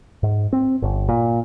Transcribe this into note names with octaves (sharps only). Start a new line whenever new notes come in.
G#2
C4
G1
A#2